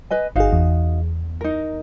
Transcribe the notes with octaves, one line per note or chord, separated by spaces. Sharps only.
B4 D#5 G#5
G1 D#4 F#4 G#4 F5
E2
D#4 A#4